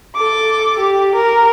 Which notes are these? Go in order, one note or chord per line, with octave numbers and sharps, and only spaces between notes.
A4 D6
G4
A#4